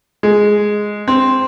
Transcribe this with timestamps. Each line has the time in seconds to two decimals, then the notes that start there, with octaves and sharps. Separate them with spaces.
0.23 G#3
1.08 C4